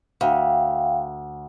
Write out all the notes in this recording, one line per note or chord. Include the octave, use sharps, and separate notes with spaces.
D2 F5 G5